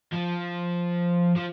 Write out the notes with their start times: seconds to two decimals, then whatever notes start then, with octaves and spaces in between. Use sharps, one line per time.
0.13 F3
1.36 F3